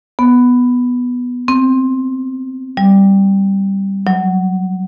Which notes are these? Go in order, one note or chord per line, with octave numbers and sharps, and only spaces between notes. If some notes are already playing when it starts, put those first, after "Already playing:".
B3
C4
G3
F#3